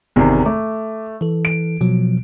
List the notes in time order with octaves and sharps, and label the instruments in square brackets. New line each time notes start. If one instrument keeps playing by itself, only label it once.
[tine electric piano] G1 D#4 [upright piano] E2 C3 D#3
[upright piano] A3 [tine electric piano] D6
[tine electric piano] E3 A4
[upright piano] D7
[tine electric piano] B2 F3 F#3